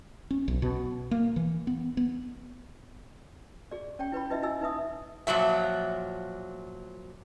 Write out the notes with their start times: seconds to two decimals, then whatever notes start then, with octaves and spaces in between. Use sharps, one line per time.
0.31 C#4
0.48 B1
0.62 B2
1.11 A#3
1.36 E3
1.67 B3
1.97 B3
3.71 G#4 D5
3.99 C#4 C#5 G5
4.12 E4 B4 C#5 B5
4.30 D#4 E4 B4 D#5 E5
4.42 E4 B4 D#5 G#5 E6
4.61 D#4 B4 E5 D#6
5.27 A#2 F3 F#3 E5